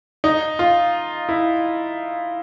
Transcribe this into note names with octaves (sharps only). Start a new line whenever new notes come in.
D#4
F4
E4